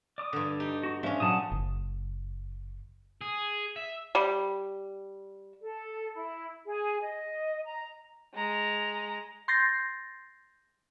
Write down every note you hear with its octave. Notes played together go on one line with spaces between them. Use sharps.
D5 D6 D#6
G2 D3
D#4 G4
F#4
F3 C#4 D4 E5
A#2 F#3 F#5 A5 D#6
F#1
G#4
E5
G3
A4
E4
G#4
D#5
A#5
G#3 A#5
C6 G6 A6 A#6 C7